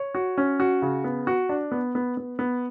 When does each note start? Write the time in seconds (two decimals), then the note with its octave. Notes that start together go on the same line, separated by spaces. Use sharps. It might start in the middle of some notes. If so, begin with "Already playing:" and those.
Already playing: C#5
0.15 F#4
0.38 C#4
0.60 F#4
0.82 C#3
1.04 B3
1.27 F#4
1.49 D4
1.72 B3
1.95 B3
2.17 B3
2.39 B3